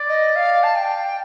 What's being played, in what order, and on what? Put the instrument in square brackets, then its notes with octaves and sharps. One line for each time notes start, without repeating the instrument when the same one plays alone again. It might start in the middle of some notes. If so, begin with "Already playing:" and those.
Already playing: [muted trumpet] D5
[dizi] D#5
F5
A5
G5